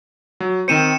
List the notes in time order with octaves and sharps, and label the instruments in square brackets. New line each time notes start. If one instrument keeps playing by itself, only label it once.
[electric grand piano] F#3
[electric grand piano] D#3 C4 C5 [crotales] C#7 D#7 E7